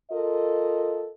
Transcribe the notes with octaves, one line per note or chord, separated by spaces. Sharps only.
F4 A4 A#4 D#5